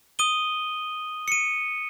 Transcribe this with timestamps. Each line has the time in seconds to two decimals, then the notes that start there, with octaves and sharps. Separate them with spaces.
0.19 D#6 D#7 G7
1.28 C#7 D#7